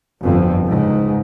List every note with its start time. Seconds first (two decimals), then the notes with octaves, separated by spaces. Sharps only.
0.21 G1 F2
0.68 C#2 G#2